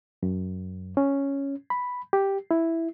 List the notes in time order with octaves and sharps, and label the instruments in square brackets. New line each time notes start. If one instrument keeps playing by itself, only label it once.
[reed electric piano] F#2
C#4
B5
G4
E4